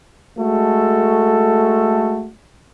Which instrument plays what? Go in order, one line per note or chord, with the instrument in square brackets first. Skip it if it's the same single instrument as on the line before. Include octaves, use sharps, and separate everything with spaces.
[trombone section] G#3 A3 F#4 A4